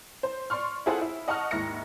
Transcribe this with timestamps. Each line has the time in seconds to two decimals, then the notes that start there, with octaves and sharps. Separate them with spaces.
0.23 C5
0.50 D5 C6 C#6 F6
0.86 E4 F4 G#4 A4 C5 F#5
1.01 E4
1.28 D#5 F#5 A5 C#6 F6
1.51 D#2 G#2 E4 A#6 C#7